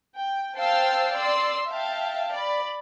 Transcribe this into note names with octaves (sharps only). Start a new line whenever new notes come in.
G5
C5 F5 G5 A5 E6 C7
D5 C6 E6 C7
E5 F5 G5 A5
D5 B5